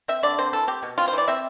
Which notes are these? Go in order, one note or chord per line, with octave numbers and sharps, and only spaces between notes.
C4 E5
D3 D5
C4 C5
E3 A4
C4 G4
B2
C4 F4
C5
E3 D5
C4 E5